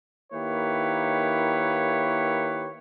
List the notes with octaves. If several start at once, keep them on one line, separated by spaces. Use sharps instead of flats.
D#3 A#3 E4 G4 B4 C#5